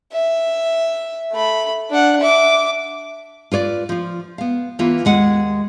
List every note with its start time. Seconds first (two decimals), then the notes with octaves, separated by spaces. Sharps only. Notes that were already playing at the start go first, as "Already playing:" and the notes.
0.12 E5
1.32 A3 B5
1.90 D4 F#5
2.20 E5 D6
3.51 F4 B4 C#5 D5
3.89 F3 F4
4.38 B3 F5
4.79 E3 A#3 B3 F4 B4
5.05 D#2 G#3 F#5